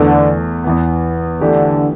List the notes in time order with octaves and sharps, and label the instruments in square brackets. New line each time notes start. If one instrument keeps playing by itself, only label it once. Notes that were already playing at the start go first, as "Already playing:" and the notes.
Already playing: [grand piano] E2 E3 A3 [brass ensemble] D3
[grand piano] E2 E3 B3
[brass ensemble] D3 [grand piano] E3 A3 G4